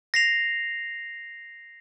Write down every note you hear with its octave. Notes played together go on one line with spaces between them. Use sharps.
A#6 C7 F7